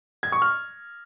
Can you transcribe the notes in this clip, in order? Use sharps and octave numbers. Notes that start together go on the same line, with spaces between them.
G#6
C#6
F6